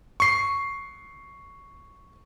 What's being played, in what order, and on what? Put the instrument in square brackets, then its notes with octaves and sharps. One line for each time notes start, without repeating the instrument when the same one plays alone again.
[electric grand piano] C#6 C7